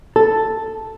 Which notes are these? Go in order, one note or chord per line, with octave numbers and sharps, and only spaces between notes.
A4